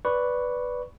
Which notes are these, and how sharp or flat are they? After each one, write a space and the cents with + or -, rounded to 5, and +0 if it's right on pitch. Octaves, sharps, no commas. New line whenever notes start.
B4 +0 D5 -5 C#6 +0